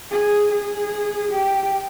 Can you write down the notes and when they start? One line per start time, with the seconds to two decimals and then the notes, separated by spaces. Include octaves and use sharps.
0.11 G#4
0.51 G#4
1.31 G4